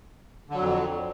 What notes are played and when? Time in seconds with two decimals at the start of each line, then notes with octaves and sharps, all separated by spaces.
0.50 D3
0.55 F#3
0.60 F2